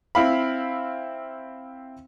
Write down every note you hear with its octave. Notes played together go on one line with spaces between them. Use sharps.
C4 E4 F5 B5